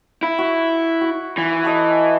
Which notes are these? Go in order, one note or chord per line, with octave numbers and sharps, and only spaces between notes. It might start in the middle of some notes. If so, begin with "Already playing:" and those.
E4
F#4
F#4
E3
F#4 A4 D#5